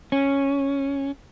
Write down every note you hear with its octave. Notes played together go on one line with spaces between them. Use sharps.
C#4